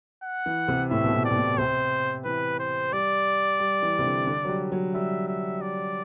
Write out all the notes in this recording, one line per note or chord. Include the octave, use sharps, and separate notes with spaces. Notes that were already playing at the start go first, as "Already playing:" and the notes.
F#5
E3
C3
A2 E5
B2
A2
D5
B2
A2
C3 C5
E3 B4
C5
G3 D5
G3
E3
C3
D3
D3
F#3
G3
F#3
G3 E5
E5
D5